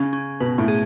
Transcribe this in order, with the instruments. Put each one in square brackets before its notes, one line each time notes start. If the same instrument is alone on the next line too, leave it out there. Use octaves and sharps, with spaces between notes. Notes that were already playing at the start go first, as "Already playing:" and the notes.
Already playing: [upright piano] C#3 [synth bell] C#4
[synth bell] C#4
[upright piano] B2 [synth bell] B4
[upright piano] A2
[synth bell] G#4